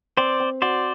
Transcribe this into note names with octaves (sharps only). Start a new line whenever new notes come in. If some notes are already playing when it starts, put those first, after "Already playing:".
C4 C5 D5
C4
F#4 C5 D5